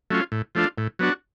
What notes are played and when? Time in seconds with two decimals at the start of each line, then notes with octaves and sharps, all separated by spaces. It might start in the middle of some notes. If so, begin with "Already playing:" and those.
0.11 F#3 A3 C#4 F4
0.32 A2
0.55 F3 A3 D4 F4
0.78 A2
0.99 F#3 B3 D4 F#4